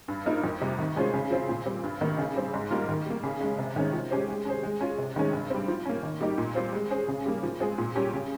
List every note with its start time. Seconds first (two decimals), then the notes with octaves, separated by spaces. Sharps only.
0.08 G2
0.26 F3 A#3 D#4 A#4
0.44 F2
0.61 C3 G3
0.78 D#3
0.96 G#3 C#4 F4 C5
1.14 C#3
1.31 F3 C4 F4 C5
1.49 A#2
1.66 G3 C4
1.83 G2
2.01 D#3 A#3 D#4
2.18 C#3
2.36 G3 C4
2.54 G#2
2.71 G3 A#3 F4 A#4
2.89 D#3
3.06 G3 A#3
3.23 C#3
3.41 G#3 C#4
3.58 C3
3.76 D#3 G#3 C#4
3.93 F3
4.11 G#3 C#4 G4 C5
4.28 G#3
4.45 C#4 G#4 C5
4.63 G#3
4.81 C#4 F4
4.98 C3
5.16 D#3 G#3 C#4
5.33 G2
5.50 G3 C4
5.68 F3
5.86 A#3 C#4
6.03 D#3
6.21 G3 A#3 D#4 G4
6.38 A#2
6.55 G3 C4 F4 C5
6.73 G#3
6.91 C#4 G#4 C5
7.08 C#3
7.26 G3 A#3
7.43 F3
7.60 G#3 C4 F4 G#4
7.78 A#2
7.96 G3 C#4 G4
8.13 C#3